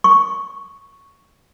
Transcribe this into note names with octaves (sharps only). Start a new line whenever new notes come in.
C#6